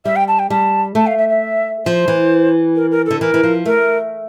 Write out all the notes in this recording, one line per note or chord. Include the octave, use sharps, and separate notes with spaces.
G3 E5
G5
A5
G5
G3 A5
A3 A5
F5
E5
E5
F3 C5
E3
A#4
A#4
D3 A4
E3 A#4
E3
F3
A3 A#4